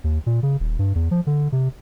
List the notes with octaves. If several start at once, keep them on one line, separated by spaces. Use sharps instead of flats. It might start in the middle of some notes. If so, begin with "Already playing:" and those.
D#2
A#2
C#3
D#1
G2
E2
F3
D3
C3